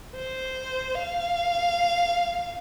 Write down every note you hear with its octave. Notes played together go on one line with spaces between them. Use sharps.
C5
F5